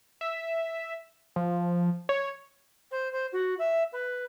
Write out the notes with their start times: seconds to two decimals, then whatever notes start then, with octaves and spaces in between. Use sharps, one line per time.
0.21 E5
1.36 F3
2.09 C#5
2.91 C5
3.12 C5
3.32 F#4
3.58 E5
3.92 B4